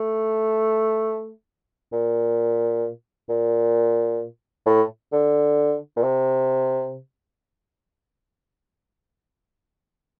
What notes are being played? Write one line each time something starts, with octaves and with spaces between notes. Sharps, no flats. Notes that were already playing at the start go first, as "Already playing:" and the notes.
Already playing: A3
A#2
A#2
A2
D3
A#2
C3